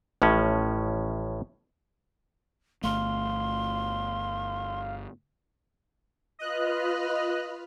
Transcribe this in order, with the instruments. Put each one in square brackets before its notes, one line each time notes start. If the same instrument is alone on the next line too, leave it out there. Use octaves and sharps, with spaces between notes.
[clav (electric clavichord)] A1 A2 F3 C#4
[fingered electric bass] G1 A3 [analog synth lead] F5 [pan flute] C6
[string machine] F4 B4 F6 [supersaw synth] D#5 F#6